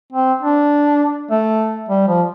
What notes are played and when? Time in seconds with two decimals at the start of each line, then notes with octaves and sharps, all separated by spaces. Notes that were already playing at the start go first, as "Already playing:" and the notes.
0.12 C4
0.42 D4
1.31 A3
1.89 G3
2.08 F3